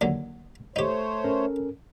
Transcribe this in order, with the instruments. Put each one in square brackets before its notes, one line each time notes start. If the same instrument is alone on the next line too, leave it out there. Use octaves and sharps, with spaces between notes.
[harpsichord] D#2 D3 F#3
[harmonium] A3 C5 C#5 [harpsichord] D#4 G4
[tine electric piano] C#4 A4 A#4